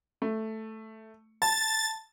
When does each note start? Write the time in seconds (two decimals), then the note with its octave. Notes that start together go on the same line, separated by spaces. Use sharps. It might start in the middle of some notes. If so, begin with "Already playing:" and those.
0.22 A3
1.42 A5 A6